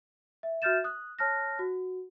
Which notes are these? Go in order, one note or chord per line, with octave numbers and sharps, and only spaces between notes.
E5
F#4 E5 F6 G6 A6 E7
D#6 F#6
C#5 A5 F6 F#6 A#6
F#4